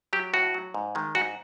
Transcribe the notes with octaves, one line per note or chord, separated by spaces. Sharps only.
F#3 G4
A2 F#4
F#3
G#2
D#3 G#3
G#2 F#4